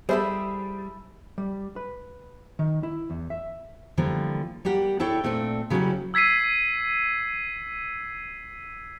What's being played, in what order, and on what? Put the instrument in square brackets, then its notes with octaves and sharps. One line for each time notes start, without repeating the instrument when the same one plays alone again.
[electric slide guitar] G3 [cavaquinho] E4 A4 B5 [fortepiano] G#4 C5 E5
[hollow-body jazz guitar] G3
B4
D#3
E4
E2
E5
[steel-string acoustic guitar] D3 E3 F3 G3 A#3
G3 A#3 G4 F#5
D4 E4 A4 C#5 G5
A#2 A3 C4 D4
C#3 F#3 G3 A#3 C#4 E4
[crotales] E6 G#6 B6 C7 D#7